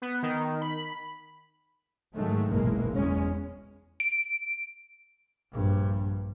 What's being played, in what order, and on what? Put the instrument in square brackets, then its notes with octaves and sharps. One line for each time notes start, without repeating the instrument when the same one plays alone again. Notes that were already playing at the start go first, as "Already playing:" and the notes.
[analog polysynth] B3
D#3
B5
[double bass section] G#2 D#3 F#3 G#3 A3
F#1 B1 A#2 E3 G#3 A#3
E2 G#3 C#4
[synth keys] D7
[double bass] A#1 G2